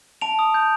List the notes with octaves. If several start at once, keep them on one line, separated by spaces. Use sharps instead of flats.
A5 D7 F7
D#6
G6